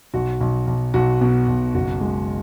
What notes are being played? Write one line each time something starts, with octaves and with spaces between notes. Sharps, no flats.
B1 F#4
B1
B1
B1 F#4
B2
B1
F#1 F#4
G#3